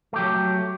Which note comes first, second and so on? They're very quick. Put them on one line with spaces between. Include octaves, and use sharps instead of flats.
A3 G4 F#3